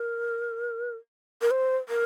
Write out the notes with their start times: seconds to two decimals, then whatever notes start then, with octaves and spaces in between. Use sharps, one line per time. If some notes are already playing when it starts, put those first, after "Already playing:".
Already playing: A#4
1.42 A#4
1.51 C5
1.89 A#4